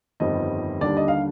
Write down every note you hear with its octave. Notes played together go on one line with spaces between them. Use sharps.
G1 F2 D#3 G3 D#5
D#2 D3 G3 D4 D5
D#5
F5